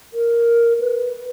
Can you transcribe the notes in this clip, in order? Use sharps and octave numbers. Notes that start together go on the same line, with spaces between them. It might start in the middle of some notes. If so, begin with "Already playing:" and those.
A#4
B4